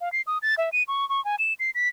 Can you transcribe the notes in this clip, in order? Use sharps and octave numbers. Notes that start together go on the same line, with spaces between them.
F5
C7
D#6
A6
E5
D#7
C#6
C#6
G#5
E7
C7
B6